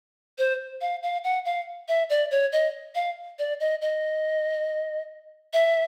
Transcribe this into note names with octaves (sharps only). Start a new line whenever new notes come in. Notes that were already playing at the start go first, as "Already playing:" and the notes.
C5
F5
F5
F#5
F5
E5
D5
C#5
D#5
F5
D5
D#5
D#5
E5